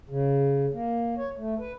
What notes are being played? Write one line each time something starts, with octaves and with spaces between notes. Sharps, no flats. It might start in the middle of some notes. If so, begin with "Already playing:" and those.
C#3
A#3
C#5
A3
B4